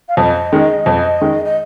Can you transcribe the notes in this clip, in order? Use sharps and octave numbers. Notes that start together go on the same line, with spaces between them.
F5
F2 D#5
D#3 G#3
F2
D#3 G#3
D#5